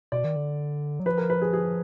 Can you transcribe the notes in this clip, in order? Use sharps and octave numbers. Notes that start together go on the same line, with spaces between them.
B2 D5
D#3
D3
F#3
F3 B4
A#4
B4
G#4
G#4